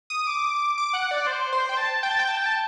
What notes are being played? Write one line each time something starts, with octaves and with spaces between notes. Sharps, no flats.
D#6
D6
D6
F#5
D5
C5
C5
G5
A5
G5
A5
G5
A5
G5
A5